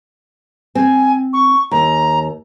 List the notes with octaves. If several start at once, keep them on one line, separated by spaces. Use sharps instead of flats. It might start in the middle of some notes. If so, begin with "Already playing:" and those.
C4 G#5
C#6
D#2 A#5